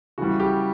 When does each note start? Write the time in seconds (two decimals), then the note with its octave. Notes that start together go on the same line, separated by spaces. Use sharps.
0.18 C#3 E3 G3 F#4
0.40 G4